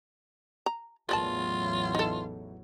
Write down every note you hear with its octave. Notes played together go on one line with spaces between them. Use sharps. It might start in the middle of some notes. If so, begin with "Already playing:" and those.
A#5
A1 E2 F#3 F4 A#4 D5 A5
D#4 A4